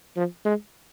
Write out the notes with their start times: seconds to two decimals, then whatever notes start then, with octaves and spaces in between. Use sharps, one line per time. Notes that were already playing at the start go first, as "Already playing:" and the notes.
0.16 F3
0.45 G#3